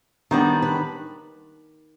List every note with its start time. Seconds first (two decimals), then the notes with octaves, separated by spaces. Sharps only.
0.31 D#3 G3 B3 D4
0.62 B4